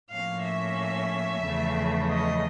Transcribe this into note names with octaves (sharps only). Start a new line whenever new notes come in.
A2 F3 A#3 C#4 F5
E5
E2 C#3 F3 A3
D#5